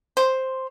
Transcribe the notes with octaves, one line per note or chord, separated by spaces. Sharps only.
C5